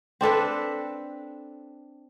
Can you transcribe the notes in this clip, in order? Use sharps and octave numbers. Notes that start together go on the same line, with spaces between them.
C4 D4 A4 B4